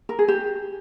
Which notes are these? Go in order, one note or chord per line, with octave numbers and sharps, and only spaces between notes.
A#4
G#4
G4